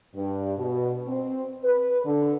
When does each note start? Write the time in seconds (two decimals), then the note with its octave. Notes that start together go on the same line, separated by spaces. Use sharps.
0.14 G2
0.58 B2
1.08 C4
1.64 B4
2.05 D3